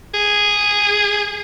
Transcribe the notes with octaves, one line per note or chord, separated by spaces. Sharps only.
G#4